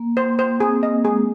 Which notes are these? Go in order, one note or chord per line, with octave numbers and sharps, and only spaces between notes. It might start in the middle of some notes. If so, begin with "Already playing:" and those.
Already playing: A#3
C5
C5
C4 G#4
A#3 D#5
G#3 G#4